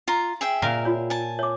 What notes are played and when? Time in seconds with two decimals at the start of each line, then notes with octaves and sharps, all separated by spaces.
0.08 F4 A#5
0.41 G#4 E5 G5
0.62 A#2 A#4 F5
0.85 F4 C#5
1.10 G#5 A5
1.39 C#5 D6